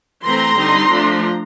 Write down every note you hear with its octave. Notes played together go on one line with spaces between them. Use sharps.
E3 A3 C4 A#5 C6
D3 G3 C4 D#4
F3 A3 D4